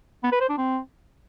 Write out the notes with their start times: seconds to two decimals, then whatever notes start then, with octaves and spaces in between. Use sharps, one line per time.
0.24 B3
0.32 B4
0.41 C5
0.49 D4
0.58 C4